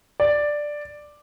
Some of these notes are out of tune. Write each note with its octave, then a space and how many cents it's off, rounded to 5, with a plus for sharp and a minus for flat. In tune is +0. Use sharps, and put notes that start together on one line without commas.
D5 +5